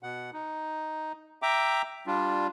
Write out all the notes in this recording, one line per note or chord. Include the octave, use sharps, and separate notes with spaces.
B2 F#5
D#4
E5 G5 A#5 D6
G3 D4 F4